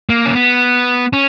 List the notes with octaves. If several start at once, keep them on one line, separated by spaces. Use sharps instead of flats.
A#3
C#4
B3
C#4